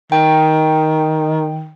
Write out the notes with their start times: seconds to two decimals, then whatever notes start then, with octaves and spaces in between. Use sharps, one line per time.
0.12 D#3 G5